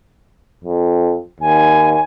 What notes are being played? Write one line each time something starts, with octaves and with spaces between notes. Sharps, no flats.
F2
D#2 G#5